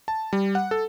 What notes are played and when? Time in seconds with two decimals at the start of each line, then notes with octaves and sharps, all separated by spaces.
0.08 A5
0.33 G3
0.55 F#5
0.71 A4